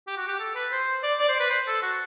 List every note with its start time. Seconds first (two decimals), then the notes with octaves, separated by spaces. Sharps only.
0.07 G4
0.17 F#4
0.28 G4
0.40 A4
0.55 B4
0.72 C5
1.03 D5
1.20 D5
1.29 C5
1.40 B4
1.50 C5
1.68 A4
1.83 F#4